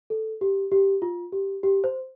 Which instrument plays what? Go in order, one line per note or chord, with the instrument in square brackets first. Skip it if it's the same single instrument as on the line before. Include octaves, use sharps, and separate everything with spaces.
[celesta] A4
G4
G4
F4
G4
G4
C5